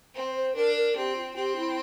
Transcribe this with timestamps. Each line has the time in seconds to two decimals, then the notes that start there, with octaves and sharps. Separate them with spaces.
0.15 C4 C5
0.35 C5
0.55 D4 A#4
0.75 A#4
0.96 C4 G4
1.15 F4
1.35 C4 G4
1.55 E4